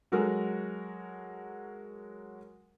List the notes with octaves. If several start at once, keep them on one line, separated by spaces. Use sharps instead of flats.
F#3 G#3 F#4 A4 A#4